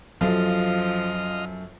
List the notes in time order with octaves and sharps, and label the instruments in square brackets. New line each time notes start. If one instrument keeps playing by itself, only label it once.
[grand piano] F#2 A4 [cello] F3 [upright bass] F#3 [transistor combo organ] F4 D#5 F6